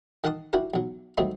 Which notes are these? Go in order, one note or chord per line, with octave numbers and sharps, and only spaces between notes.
D#3 A#4 F#5 A5 C6 D#6
D4 E4 F#4 G4 A#4
B1 F#3
D#3 F#3 G3 A3 C4 D#4